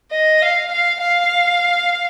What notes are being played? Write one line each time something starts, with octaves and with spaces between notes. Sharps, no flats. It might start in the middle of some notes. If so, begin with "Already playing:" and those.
D#5
F5
F5
F5